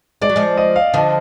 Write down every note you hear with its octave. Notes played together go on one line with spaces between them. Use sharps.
G#3 D5
F#3
F3 G#3
D#5
F5
D3 F3 D#5